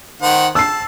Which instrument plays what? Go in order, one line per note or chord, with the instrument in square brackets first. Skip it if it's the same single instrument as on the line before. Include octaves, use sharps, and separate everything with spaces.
[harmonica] D#3 C5 F#5
[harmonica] A5 [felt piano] E6 C7